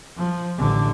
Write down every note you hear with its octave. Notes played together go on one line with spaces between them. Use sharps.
F3
A1 D3